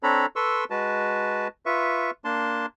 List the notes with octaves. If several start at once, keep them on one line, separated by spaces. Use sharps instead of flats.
C4 D4 A4 C#5 A#5 B5
A4 B4 C6 C#6 E6
G#3 F#4 B4 A5
F4 B4 E5 C#6
A#3 D4 A5 C6